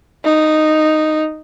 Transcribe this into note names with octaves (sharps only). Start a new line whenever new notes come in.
D#4